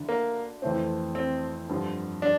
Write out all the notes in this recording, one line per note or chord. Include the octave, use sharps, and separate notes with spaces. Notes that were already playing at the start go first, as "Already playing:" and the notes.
Already playing: D2 D3 D4
A#3
F2 E3 A3 C4
C4
G2 D3 F3
D4